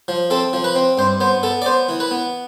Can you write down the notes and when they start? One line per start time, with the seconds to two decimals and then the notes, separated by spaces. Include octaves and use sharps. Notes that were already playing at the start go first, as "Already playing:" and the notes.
0.08 F3
0.30 C4 A4
0.53 F3
0.64 B4
0.75 C4
0.98 G2 C5
1.20 B3 C5
1.43 B3 A4
1.62 D5
1.66 B3 C5
1.89 E3
2.00 B4
2.11 B3